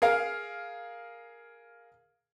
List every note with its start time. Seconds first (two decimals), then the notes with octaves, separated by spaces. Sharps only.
0.02 G#4 A#4 F5